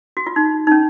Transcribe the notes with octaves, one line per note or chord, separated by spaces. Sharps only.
F#4
F4
D#4
D#4
C#4